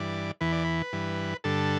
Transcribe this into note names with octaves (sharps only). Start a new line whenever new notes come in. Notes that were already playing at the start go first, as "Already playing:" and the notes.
Already playing: G2 E3 D5
E2 E3 B4
D5
B4
G2 E3
G2 D3 A4